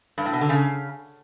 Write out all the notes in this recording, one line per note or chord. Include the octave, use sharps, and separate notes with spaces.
G2
A2
B2
D3
C#3